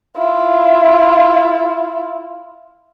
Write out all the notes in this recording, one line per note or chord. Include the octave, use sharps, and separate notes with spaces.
E4 F4